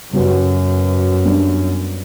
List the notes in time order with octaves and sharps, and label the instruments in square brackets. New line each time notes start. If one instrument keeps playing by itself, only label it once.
[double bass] F#2 [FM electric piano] C#3 G3 B3 F#4 B4
[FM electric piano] G3 B3 D4